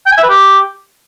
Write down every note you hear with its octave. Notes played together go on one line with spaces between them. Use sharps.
G5
G#5
E5
B4
G4